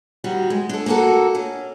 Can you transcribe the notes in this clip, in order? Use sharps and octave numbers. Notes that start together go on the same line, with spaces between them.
D#3 G3 F#4
G#3
D4 A4
A#3 B3 D#4 F#4 A4
C#4 D4